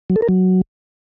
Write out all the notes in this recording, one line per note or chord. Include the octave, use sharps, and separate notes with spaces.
F#3
A4
A#4
F#3